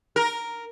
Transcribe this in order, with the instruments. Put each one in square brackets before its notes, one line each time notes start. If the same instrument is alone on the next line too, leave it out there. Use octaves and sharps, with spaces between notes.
[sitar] A#4